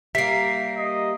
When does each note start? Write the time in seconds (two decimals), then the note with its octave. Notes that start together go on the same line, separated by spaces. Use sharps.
0.15 G3 A#3 E5 B6 C7
0.77 D#5